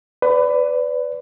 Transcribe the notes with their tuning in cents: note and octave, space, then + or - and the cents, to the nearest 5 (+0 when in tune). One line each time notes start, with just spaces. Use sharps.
B4 +25 D5 -15